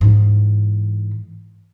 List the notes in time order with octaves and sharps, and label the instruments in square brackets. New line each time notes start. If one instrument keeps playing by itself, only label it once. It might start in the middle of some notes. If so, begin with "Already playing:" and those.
[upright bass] G#2 E3